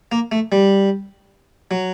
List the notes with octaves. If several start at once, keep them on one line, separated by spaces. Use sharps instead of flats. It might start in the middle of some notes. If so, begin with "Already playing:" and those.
A#3
A3
G3
F#3